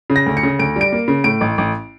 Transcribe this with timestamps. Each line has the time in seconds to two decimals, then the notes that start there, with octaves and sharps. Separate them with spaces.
0.10 C#3
0.16 A#6
0.26 D2
0.37 C#7
0.43 C#3
0.59 D2 D7
0.76 G3 D7
0.92 A#3
1.08 C#3
1.24 A2 D7
1.41 A1
1.58 A1